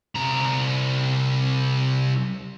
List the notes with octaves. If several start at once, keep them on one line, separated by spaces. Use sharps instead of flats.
C2 A#5